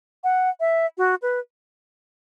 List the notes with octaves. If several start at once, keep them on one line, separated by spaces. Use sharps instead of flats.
F#5
E5
F#4
B4